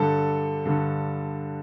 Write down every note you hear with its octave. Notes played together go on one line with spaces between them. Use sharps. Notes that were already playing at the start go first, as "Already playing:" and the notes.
Already playing: G2 D3 A4
G2 D3